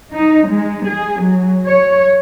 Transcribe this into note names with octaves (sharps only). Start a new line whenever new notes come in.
D#4
G#3
G#4
F#3
C#5